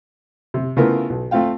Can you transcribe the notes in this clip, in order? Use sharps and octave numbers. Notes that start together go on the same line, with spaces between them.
C3
C#3 A3 B3 E4 F4 A#4
B1
A3 C4 F4 F5 G5